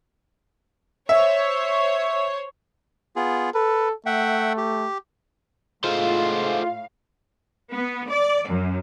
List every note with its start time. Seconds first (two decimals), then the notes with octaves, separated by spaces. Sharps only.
1.09 C5 C#5 E5
3.16 B3 F4 G#4
3.54 A4 B4
4.06 A3 E5 F#5 G5
4.57 G4
5.84 A2 G#3 A3 F4 C5 F5
7.71 B3
8.09 D5
8.48 F#2